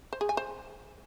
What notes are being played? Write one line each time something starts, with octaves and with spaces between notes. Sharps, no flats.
C5
G#4
G#5
C5